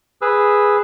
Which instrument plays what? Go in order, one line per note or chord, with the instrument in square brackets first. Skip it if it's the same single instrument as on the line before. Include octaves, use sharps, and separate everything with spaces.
[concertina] G#4 B4 E6